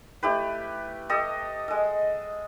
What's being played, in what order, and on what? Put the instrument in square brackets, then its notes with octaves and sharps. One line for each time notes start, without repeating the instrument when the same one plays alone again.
[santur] A3 E4 G4 B4
G4 A4 D#5 D#6
G#3 A4